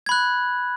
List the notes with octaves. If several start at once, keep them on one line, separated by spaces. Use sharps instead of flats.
B5 F#6 G#6